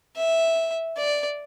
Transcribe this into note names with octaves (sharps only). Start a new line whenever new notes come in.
E5
D5